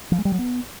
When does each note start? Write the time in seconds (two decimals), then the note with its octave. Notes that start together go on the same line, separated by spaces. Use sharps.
0.12 F3
0.18 G#3
0.25 G3
0.32 F#3
0.39 B3